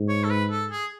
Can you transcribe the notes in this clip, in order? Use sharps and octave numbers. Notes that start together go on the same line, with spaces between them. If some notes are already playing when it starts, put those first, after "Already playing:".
Already playing: G#2
C#5
A4
B4
A4
G#4